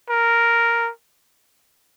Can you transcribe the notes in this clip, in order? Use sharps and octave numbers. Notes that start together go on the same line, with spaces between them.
A#4